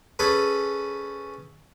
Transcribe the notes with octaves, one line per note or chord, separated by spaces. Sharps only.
C#4 G#4 A4 B4